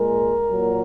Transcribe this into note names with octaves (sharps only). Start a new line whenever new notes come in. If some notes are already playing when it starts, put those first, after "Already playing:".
Already playing: A#2 G#3 A#4
A#2 F#3